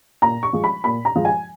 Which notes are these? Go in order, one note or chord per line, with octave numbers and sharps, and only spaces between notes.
A#2 A#5
C#6
F3 G#3
B5
A#2 B5
A#5
F3 G#3
G#5